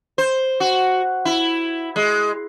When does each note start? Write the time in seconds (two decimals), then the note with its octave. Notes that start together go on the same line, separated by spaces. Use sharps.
0.18 C5
0.60 F#4
1.25 E4
1.96 G#3